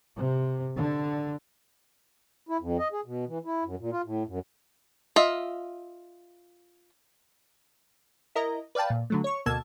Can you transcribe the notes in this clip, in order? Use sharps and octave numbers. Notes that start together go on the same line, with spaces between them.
C3
D3
E4
F2
D#5
G#4
B2
E3
E4
F#2
A#2
F4
A2
F#2
F4 D#5 E5
E4 A#4 D#5 A#5
B4 D5 F5 G5 A5
A#2
D3 F#3 A3
C#5 C#6
D2 B2 A#3 A5 E6 G#6